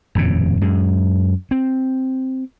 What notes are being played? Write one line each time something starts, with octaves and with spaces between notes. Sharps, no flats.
D#1 F2 A2 C#3
F#2 G#3
C4